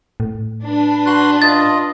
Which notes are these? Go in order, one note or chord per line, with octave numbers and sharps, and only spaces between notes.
A2
D4 B4
F#4 C6 F#6
F4 D#5 A6